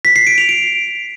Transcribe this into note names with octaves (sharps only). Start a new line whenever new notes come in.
B6
C7
D7
F7
D7